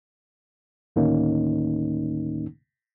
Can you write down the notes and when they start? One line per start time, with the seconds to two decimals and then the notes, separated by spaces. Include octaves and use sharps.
0.96 D2 A2 D#3 A#3 C#4 D#4